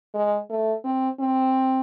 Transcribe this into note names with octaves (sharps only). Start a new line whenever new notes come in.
G#3
A3
C4
C4